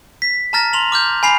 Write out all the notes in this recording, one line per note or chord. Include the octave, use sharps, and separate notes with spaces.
B6
A5 A#5 F6 A6 A#6
C6 F7 F#7
D6 F6 G6
G#5 B5 C7 F7